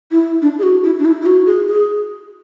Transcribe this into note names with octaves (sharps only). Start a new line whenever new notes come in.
E4
D4
G#4
F#4
E4
D4
E4
E4
F#4
G#4
G#4